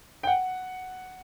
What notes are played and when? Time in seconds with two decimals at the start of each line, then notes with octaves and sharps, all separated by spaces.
0.23 G5
0.27 F#5